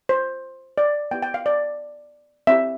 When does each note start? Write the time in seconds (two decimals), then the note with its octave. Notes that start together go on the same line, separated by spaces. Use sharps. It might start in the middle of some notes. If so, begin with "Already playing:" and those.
0.09 C5
0.78 D5
1.11 B3 E4 G4 G5
1.22 G5
1.34 F5
1.46 D5
2.47 C4 E4 G4 E5